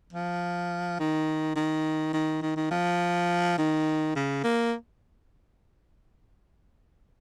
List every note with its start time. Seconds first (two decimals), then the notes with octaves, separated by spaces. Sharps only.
0.13 F3
0.99 D#3
1.56 D#3
2.13 D#3
2.42 D#3
2.56 D#3
2.71 F3
3.58 D#3
4.16 C#3
4.44 A#3